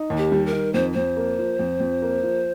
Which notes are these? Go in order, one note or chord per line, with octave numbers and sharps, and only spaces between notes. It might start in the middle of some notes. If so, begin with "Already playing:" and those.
Already playing: D#4
D#2
G4
G3
A#4
D#3
F2 C5
F2 C5
A#3
F3
F2
F2
A#3
F3